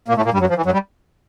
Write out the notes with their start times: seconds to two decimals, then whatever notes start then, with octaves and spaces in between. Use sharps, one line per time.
0.08 A#2 A#3
0.16 A2 A3
0.25 A#2 A#3
0.33 G2 G3
0.40 F#2 F#3
0.49 F3
0.57 E3
0.65 F#2 F#3
0.73 G3